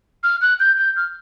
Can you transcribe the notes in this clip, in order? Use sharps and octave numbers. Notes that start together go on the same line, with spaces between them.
F6
F#6
G6
G6
F6